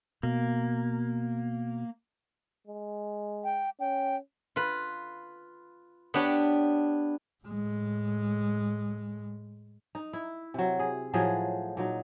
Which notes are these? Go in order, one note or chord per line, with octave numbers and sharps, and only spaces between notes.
B2 A#3
G#3
G5
C#4 G5
F4 B4
B3 D4 G4 C#5
A2 G#3
D#4
E4
C3 F#3
G#4
A2 F3 F#3 G#4
A#2 F#3 D#4